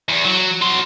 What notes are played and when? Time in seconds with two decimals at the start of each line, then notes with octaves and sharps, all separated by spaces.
0.09 E2
0.25 F#3
0.62 F#3 C6